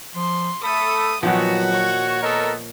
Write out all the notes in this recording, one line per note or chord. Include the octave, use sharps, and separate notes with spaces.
F3 C6
A3 A4 B5 D#6
A#2 D#3 F3 F#3 B3 F#4
C#5
B3 A4 A#4 D#5